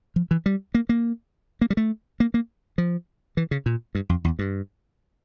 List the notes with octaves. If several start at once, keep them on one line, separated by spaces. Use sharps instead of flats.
F3
E3
G3
A#3
A#3
A#3
G3
A3
A#3
A#3
F3
E3
C#3
A#2
G2
F2
E2
G2